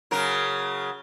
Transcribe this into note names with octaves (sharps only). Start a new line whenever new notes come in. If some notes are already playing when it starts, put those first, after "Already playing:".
C#3 F#3 A#4